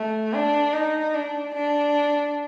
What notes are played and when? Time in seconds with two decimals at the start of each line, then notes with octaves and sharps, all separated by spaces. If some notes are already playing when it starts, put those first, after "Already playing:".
Already playing: A3
0.34 D4
0.74 D#4
1.14 D4
1.55 D4